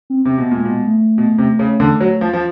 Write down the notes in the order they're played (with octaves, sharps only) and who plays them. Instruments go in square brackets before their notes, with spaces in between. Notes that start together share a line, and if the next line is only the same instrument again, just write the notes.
[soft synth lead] C4
[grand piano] C3 [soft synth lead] C4
[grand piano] B2 [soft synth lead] B3
[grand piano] A#2
[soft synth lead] G#3
[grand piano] B2
[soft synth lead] A3
[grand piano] B2
C3
C#3
D3
F#3
F3
F3